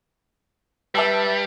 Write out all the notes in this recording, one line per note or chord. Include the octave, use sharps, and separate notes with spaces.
G3 B4 E5 A5 E6